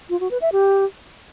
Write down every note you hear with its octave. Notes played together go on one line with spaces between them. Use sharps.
F4
F#4
B4
E5
G4